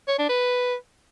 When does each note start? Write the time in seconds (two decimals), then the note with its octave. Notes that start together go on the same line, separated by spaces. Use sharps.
0.08 C#5
0.19 D4
0.29 B4